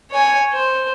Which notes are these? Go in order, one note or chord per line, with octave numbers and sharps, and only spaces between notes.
C#5 G#5
C5